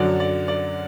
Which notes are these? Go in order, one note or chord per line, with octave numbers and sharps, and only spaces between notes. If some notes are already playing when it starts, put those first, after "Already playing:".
Already playing: F#2 D3 F#3 D5
D5
D5